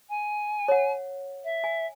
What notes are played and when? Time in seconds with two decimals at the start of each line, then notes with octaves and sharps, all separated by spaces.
0.09 G#5
0.68 C#5 F#5
1.44 E5
1.64 G#5